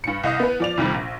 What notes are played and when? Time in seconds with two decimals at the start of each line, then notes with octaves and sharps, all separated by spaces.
0.04 G2 C#7
0.23 C2 D#5 F5 D#6
0.40 B3 B4
0.60 F3 D5 F7
0.78 F2 C3 D#3 G3
0.94 A#1